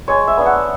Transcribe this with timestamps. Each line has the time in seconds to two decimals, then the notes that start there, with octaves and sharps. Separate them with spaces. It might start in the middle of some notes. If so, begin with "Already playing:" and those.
0.08 G#3 C#5
0.28 E5
0.37 B3 D4
0.46 F#5